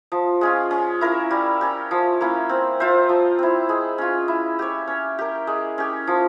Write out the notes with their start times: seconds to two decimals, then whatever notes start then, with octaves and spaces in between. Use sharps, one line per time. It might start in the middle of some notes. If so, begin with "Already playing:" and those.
0.12 F3
0.41 G#3 C#4 F4
0.71 C#4
1.01 E4 A#4 F5
1.31 G3
1.61 C#4 G4
1.91 F3
2.21 A#3 C#4 E4
2.49 C4
2.80 F4 C5 E5
3.09 F3
3.39 C4 E4
3.69 G#3
3.98 C#4 F4
4.28 E4
4.59 G4 C#5
4.88 C#4
5.19 G4 A#4
5.47 G#3
5.78 C#4 G4
6.07 F3